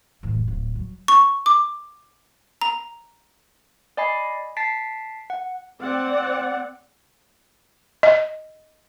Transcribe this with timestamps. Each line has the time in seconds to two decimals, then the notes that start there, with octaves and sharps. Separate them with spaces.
0.23 A2 E3
0.34 F#1
0.48 D1
0.75 F#3
1.08 C#6
1.46 D6
2.61 A#5
3.97 D5 D#5 G#5 B5 C7
4.57 A5 A6 B6 C7 D7
5.30 F#5
5.82 C4 D5 F#5
8.03 D#5